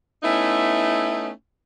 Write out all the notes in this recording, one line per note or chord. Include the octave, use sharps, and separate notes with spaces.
A3 B3 C#4 D#4 E4